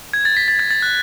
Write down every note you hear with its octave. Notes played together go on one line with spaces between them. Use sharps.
G#6
A6
B6
A6
G#6
A6
F#6